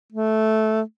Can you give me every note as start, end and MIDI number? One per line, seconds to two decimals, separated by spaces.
0.12 0.82 57